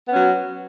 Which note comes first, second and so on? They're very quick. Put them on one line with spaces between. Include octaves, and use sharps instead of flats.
B3 C#4 F#3